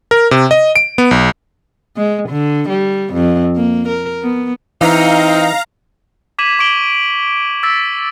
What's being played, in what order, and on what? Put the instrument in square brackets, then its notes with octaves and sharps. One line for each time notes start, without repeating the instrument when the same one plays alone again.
[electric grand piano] A#4
C3
D#5
D7
B3
B1
[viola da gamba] G#3
D3
G3
F2
A#3
A#4
B3
[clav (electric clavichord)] E3 [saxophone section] C4 D#4 [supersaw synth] F5 A#5
[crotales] D6 G#6 B6 D#7 E7 F#7
C#6 D6 D7 F#7 G7
E6 A6 B6